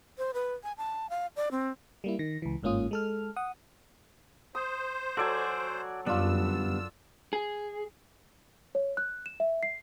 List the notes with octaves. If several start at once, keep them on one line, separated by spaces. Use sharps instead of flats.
C5
B4
G#5
A5
F5
D5
C4
G3 A#3 E4
D#3 A#6
C#2 E3
G1 G#2 A#3 C#4 F4 D#6
G#3 A4 F6
F#5 D#6
C5 D#6
F#3 F#4 A4 D5 G#5
F#2 D3 G3 B3 D4 F4 E6
G#4
C#5
F#6
E7
E5
C7